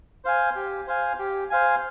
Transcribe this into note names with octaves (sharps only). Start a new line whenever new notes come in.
C5 F5 G#5
G4
C5 F5 G#5
G4
C5 F5 G#5